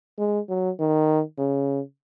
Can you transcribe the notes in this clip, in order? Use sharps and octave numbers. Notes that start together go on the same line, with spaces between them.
G#3
F#3
D#3
C#3